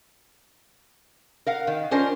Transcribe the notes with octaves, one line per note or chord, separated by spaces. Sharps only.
A#4 F5 F#5
D#3
C#4 D4 F4 A#4 C5